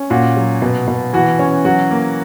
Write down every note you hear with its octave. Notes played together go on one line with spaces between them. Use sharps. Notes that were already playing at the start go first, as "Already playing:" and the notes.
Already playing: C#4
A#2 F#4
F#3
B2
B2
E3 F#4
C#4
F#3 F#4
A#3